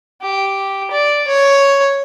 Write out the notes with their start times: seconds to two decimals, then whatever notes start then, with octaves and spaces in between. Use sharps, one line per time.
0.22 G4
0.91 D5
1.27 C#5